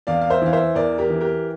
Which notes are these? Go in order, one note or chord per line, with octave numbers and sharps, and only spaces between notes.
E2 D5 F5
F5
C5 E5
E3 F5
C5 E5
E2 A#4 D5
G4 A#4
E3
G4 A#4